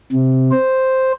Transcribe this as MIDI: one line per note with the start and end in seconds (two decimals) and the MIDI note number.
0.12 0.51 48
0.52 1.13 72